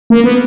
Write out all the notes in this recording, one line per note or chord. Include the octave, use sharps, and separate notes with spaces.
A#3
B3